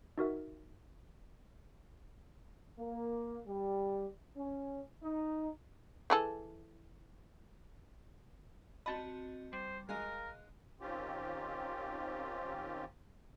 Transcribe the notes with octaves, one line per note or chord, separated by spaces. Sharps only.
D#4 F#4 A#4 E5
A#3
G3
C#4
D#4
E3 G#4 A4
C4 F#4 D#5 A5 B5
G3 C5
G#3 A#4 D#5 F5 F#6
D#3 C4 C#4 F4 G4